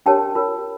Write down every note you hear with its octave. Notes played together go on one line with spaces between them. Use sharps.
D4 G4 A#4 C#5 G5 A5
F4 A#4 C#5